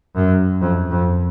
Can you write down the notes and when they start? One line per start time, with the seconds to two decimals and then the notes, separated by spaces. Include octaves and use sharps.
0.16 F#2
0.61 F2
0.91 F2